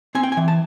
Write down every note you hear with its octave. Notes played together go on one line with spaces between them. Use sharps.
C4 G#5
G5
G#5
E3
A5